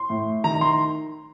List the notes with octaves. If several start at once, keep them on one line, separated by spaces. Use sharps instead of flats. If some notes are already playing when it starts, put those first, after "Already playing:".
Already playing: C6
A2
D#3 A#5
C6